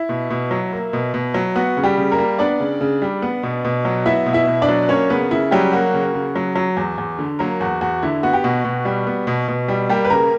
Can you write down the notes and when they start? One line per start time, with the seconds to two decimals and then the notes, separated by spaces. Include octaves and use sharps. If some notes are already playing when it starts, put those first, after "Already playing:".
Already playing: E4
0.09 B2
0.30 B2
0.51 F#3
0.73 A#3
0.93 B2
1.14 B2
1.34 F#3
1.55 B3 F#4
1.77 C#3
1.83 G3 G4
1.97 C#3
2.12 A#3 A#4
2.18 G3
2.38 B3 D4 D5
2.60 C#3
2.81 C#3
3.02 G3
3.22 B3
3.43 B2
3.65 B2
3.85 F#3
4.06 B3 E4 E5
4.26 B2
4.33 E4 E5
4.47 B2
4.62 D4 D5
4.68 F#3
4.89 A#3 C#4 C#5
5.10 C#3 B3 B4
5.31 C#3 E4
5.51 F#3 G3 G4
5.72 A#3 F#4
5.94 C#3
6.14 C#3
6.36 F#3
6.56 F#3
6.77 E2
6.98 E2
7.19 D3
7.39 F#3 A#3 A#4
7.60 E2 F#4
7.81 E2 F#4
8.02 D3 E4
8.23 B3 F#4
8.33 G4
8.44 B2 F#4
8.64 B2
8.85 G3
9.07 B3
9.27 B2
9.48 B2
9.68 G3
9.89 G3 A#3 G4
10.05 B4
10.10 C#3 A#3 A#4